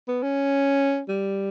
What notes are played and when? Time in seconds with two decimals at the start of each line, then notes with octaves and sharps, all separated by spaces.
0.08 B3
0.23 C#4
1.09 G3